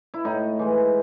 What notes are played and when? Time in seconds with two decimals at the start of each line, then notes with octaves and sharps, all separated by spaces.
0.14 E4
0.25 A2 D#4
0.59 E3 G#3